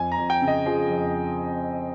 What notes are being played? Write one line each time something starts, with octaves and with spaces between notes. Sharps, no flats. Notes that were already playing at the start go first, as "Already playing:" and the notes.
Already playing: F2 G#5
A#5
F2
G5
C#3
D#5
F3 G#4
F2